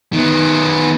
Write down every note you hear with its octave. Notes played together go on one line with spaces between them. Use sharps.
D#3 B3